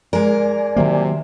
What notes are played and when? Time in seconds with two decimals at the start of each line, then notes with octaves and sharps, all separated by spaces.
0.13 G#3 A#4 D5 G#5
0.76 C3 D#3 F#3 A#3